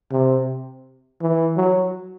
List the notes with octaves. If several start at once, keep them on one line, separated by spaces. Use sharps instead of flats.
C3
E3
F#3